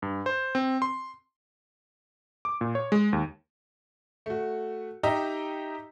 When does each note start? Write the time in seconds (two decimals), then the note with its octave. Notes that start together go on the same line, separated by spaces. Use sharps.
0.02 G2
0.26 C5
0.55 C4
0.82 C6
2.45 D6
2.61 A#2
2.75 C#5
2.92 G#3
3.13 D#2
4.26 A3 F#4
5.03 D#4 G4 D#5 E5 G5 A#5